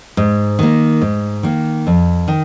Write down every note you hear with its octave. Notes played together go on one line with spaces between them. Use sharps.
G#2
D#3 A#3
G#2
D#3 A#3
F2
D#3